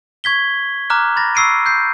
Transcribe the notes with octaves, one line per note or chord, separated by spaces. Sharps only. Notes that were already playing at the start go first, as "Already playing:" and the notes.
C#6 G#6 B6 G7
A#5 D6 F6 F#6
B5 A6 A#6
B5 C#6 E6 C7 D7 D#7
G6 C7